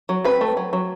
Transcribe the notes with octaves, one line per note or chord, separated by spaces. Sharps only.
F#3
C4 B4
A3
F#3
F#3